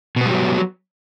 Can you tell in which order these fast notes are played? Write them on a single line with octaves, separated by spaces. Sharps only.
B2 B3 G3 F#3